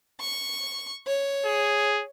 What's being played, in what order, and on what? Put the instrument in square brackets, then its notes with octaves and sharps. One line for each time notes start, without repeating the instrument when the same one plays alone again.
[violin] C#6
C#5
[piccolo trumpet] G#4